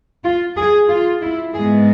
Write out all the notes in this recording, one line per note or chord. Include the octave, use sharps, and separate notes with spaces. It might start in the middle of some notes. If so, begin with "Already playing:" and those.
F4
G#4
F4
E4
G#2 G#3 B3 G#4